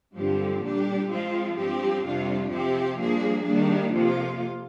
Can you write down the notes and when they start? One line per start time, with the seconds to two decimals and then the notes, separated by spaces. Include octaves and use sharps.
0.16 G2 D3 F3 C4 G4
0.62 A#2 G3 D4 G4
1.09 F3 G#3 C4 F4
1.56 G2 F3 C4 G4
2.03 F2 C3 G3 D4 F4
2.50 C3 F3 C4 G4
2.98 G2 F3 A#3 D4 G#4
3.45 D#3 G3 A#3 D4
3.91 F2 C3 F3 A#3 F4